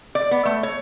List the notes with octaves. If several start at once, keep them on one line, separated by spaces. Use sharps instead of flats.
D5
B3
A3
C#5